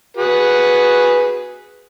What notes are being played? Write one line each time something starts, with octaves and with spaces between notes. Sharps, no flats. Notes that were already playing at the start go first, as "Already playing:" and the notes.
F#4 G#4 B4